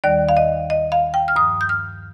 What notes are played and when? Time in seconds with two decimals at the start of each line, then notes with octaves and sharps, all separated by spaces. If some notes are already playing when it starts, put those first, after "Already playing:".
0.04 D#2 D#3 G3 D5
0.29 F5
0.37 D#5
0.70 D#5
0.92 F5
1.14 G5
1.28 F6
1.36 G2 F3 D#6
1.61 G6
1.69 F6